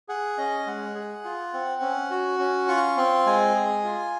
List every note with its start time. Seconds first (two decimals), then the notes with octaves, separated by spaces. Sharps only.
0.09 G#4 F#5
0.38 C#4 D#5
0.66 G#3 F#5
0.95 G#4
1.24 F4
1.53 C4
1.81 C#4
2.11 F#4
2.39 C#4
2.68 F4 C#6
2.97 C4 C6
3.26 G#3 G#5
3.55 G#4
3.84 F4